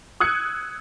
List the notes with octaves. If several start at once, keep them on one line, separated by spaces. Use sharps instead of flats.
D#6 E6 F#6 G#6 C#7